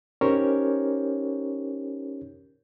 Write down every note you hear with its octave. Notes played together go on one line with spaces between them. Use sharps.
C#4 D#4 G4 A#4 C5 C#5